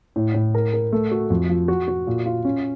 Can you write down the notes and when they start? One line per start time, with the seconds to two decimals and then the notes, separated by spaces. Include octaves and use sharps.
0.16 A2
0.34 A2
0.55 A#4
0.73 A#4
0.92 A3
1.11 F#4
1.30 F2
1.49 F3
1.68 F#4
1.88 F#4
2.07 A#2
2.26 F4
2.45 C#4